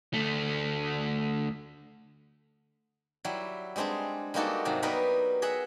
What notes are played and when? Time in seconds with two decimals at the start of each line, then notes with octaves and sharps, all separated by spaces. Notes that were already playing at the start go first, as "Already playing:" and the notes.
0.14 D2 A3
3.25 F#3 G3 E4
3.76 G3 G#3 C4 D4 G#4
4.34 G3 G#3 A#3 D#4 F#4 A4
4.65 G#2 C3 F#3
4.83 F#3 G3 B3 D#4 A#4 B4
5.42 G#4 D#5 E5 F#5